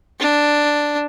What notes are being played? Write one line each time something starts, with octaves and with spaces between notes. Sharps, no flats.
D4